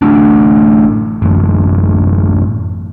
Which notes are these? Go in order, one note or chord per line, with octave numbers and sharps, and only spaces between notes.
A1 F#3 A3 D4
A1 F#2